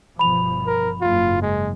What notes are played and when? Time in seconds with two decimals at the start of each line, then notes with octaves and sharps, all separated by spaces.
0.19 G1 B2 F3 B5 F7
0.67 A#4
1.01 F#1 G#2 F4
1.42 G#3